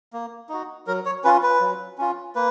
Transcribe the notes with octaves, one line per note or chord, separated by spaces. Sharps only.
A#3
D#4 F#4
F#3 A#4
C#5
C#4 F4 B4
B4
F#3
C#4 F4
A#3 B4